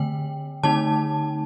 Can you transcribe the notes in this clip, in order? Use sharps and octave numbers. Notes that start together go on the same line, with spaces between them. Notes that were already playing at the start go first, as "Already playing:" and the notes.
Already playing: D3 A3 G5
D3 A3 D#4 A5